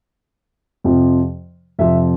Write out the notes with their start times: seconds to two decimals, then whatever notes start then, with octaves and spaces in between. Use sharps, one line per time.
0.84 F2 C3 F3
1.79 F2 C3 F3 E5